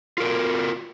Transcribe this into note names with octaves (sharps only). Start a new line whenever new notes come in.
F4 F#4 A#4